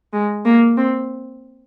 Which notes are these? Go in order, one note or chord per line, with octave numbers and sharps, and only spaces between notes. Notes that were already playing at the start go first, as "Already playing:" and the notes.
G#3
A#3
C4